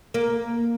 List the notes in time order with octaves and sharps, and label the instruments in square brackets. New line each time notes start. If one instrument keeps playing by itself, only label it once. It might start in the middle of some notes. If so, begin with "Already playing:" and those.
[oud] A#3